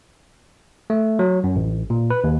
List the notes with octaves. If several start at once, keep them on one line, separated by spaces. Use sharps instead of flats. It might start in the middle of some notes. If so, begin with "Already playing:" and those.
A3
F#3
F#2
A1
A#2
B4
D#2